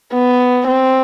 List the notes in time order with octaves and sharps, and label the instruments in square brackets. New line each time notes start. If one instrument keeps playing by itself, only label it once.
[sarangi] B3
C4